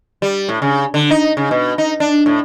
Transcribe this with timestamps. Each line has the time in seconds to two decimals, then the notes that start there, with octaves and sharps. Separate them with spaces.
0.22 G3
0.49 A2
0.62 C#3
0.94 D3
1.11 D#4
1.37 C#3
1.51 B2
1.78 D#4
2.00 D4
2.26 A2